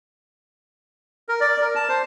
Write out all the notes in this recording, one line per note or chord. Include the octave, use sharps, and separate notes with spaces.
A#4
D5
A#4
A5
C5